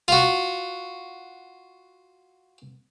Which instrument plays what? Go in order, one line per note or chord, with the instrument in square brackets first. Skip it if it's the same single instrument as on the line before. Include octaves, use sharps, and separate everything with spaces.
[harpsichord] F4 F#4